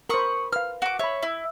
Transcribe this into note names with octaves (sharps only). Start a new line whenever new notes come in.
A#4 C5 B5 C#6 D#6
B4 F5 F6
F#4 D6
C#5 E5 B5
E4